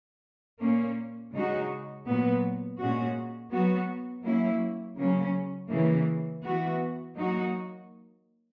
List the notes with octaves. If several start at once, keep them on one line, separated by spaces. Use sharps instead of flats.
A#2 A#3 C#4
C#3 G#3 D#4 F#4
A#2 F#3 B3
A#2 G#3 C#4 F#4
F#3 B3 F#4
F#3 A#3 C#4 E4
C#3 F#3 A#3 C#4
C#3 E3 A#3
E3 B3 F#4
F#3 A#3 D#4 F#4